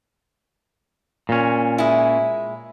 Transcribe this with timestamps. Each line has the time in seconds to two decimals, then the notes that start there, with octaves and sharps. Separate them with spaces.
1.29 A#2 C#4
1.78 G#3 E4